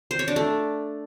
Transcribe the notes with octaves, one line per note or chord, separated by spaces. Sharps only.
C5
C#5
D4
A3